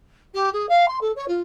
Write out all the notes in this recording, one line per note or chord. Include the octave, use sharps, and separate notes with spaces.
G4
G#4
F5
C6
A4
C#5
F4